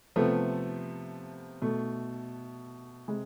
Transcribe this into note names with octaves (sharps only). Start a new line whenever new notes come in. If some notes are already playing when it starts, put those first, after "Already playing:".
C3 F3 A3 B3
B2 A3
C3 G#3